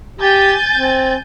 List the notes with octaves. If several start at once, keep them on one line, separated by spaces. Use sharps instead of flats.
G4 G#5 G6 A6
C4